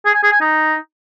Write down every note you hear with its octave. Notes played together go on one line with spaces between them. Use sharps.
G#4
G#5
G#4
G#5
D#4